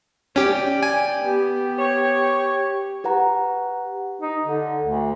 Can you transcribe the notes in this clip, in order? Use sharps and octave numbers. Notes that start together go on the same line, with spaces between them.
C#4 G4 D5 G5
G#5
B3 G4
C#5
G4 B4 F#5 A#5
D#4
D3
D2